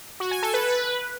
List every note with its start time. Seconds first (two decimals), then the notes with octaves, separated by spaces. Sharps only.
0.20 F#4
0.31 G#5
0.43 A4
0.54 B4